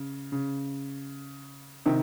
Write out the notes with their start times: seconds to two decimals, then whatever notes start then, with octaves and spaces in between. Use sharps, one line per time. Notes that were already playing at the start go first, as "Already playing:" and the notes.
Already playing: C#3
0.32 C#3
1.86 C3 D#3